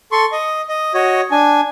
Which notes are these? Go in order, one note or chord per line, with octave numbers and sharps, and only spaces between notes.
A4 C6 C#6
D#5
D#5
F#4 C#5 D#5
D4 G#5